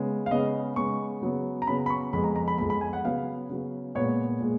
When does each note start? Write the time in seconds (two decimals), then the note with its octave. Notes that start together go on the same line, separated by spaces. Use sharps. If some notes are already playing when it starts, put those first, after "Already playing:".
Already playing: C#3 G#3 B3
0.26 F5
0.31 C#3 G#3 B3 D#5
0.76 C#3 G#3 B3 C#6
1.22 C#3 F#3 B3
1.62 A#5
1.67 C#3 F#3 B3 B5
1.86 B5
1.90 C#6
2.13 F2 F3 G#3 B3 B5
2.24 A#5
2.36 A#5
2.48 B5
2.58 F2 F3 G#3 B3 B5
2.70 B5
2.81 G#5
2.93 F#5
3.04 C#3 F#3 B3 F5
3.49 C#3 F#3 B3
3.95 A#2 G#3 B3 C#5
4.40 A#2 G#3